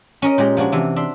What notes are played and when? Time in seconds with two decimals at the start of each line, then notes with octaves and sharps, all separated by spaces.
0.22 C#4 A#4 D#5
0.38 A#2 G#3 G4 A#5
0.57 F3 G#3 D4 F#4
0.72 C3 E3 D4
0.96 D4 E5 C6